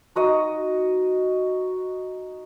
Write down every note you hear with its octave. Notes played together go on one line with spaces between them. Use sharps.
D#4 F#4 D#5